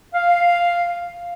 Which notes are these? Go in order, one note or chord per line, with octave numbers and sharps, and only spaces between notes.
F5